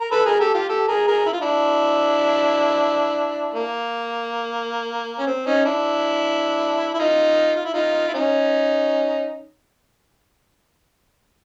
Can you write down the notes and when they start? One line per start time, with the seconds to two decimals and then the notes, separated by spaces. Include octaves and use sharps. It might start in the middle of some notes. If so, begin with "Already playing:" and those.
0.01 A#4
0.11 A4 B4
0.26 G#4 A#4
0.40 G4 A4
0.54 F4 G4
0.69 G4 A4
0.88 G#4 A#4
1.07 G#4 A#4
1.26 E4
1.33 F4
1.41 D4 E4
3.55 A#3
5.19 C#4
5.27 C4
5.46 C#4 D#4
5.65 D4 E4
6.94 E4
6.99 D#4 F4
7.56 F4
7.65 E4
7.74 D#4 F4
8.08 E4
8.14 C#4 D#4